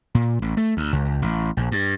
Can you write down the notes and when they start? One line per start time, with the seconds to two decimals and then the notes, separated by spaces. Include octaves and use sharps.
0.15 A#2
0.42 A1
0.57 A3
0.77 D2
0.93 C#2
1.22 A1
1.57 A#1
1.72 G2